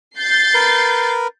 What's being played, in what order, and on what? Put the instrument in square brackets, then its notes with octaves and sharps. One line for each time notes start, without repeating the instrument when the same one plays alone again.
[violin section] G6 A6 C7
[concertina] A#4 B4